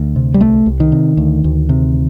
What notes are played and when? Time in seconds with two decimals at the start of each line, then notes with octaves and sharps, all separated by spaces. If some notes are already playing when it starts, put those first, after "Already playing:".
Already playing: D2
0.16 C3
0.34 G3
0.41 C2 A3
0.66 C2
0.80 D#3
0.92 C3
1.17 D2
1.44 D2
1.69 C3